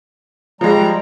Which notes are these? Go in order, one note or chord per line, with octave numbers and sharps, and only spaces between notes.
F3 G3 G#3 A#5